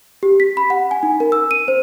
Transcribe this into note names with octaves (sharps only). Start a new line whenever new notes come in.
G4
B6
B5
F#5
G#5
D#4
A#4
E6
D#7
C5